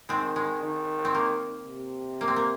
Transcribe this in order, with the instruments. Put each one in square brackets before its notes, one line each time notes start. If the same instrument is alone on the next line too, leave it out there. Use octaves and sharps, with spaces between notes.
[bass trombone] D#3 [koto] G#3 C4
[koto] G#3
[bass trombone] D#3
[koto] C4
A#3
[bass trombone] C3
[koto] A#3
C4
A#3